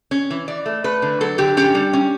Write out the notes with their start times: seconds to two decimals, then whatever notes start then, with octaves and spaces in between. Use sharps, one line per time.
0.11 C#4
0.30 E3
0.48 E3 D5
0.66 A3
0.84 A3 B4
1.02 D3
1.21 F#3 A4
1.38 D3 G4
1.57 C#4 G4
1.75 G3
1.93 C#4